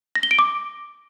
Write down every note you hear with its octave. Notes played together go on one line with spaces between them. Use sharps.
A#6
G7
D7
D6